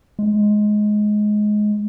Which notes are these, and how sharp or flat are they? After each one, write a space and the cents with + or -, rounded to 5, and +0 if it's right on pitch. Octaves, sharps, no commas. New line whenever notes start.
G#3 +15